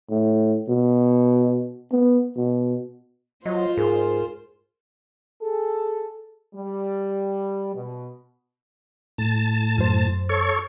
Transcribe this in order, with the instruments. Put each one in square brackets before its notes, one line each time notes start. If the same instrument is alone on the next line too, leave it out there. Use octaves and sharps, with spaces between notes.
[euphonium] A2
B2
B3
B2
[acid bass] F#3 [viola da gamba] F4 C5 [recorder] D#5
[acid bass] G#2 [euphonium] G#4 [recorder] A#4
[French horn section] G#4 A4
G3
B2
[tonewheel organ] A2 A5
[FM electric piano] F#2 C5
[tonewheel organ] A4 C#5 C#6